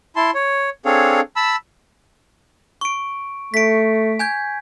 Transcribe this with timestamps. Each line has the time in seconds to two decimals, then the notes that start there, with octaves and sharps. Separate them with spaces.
0.16 E4 A5 C6
0.34 C#5
0.85 C4 D4 G#4 A4 C#5 F5
1.36 A5 B5 E6
2.81 C#6 D7
3.54 A3 B6 D7
4.19 G#5 G6 G#6